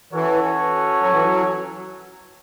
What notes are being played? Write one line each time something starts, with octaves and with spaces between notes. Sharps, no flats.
E3 C#4 F#4 A4 C#5
F#3
E3
F#3